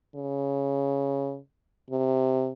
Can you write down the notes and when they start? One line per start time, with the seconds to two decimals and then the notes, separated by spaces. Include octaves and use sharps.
0.15 C#3
1.91 C3